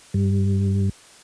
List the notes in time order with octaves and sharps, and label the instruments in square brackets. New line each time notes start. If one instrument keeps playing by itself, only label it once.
[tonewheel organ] G2